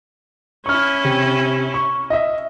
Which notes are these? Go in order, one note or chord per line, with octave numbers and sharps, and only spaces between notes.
C#4 E4 C#6 F6
C3
C#6
D#5 E5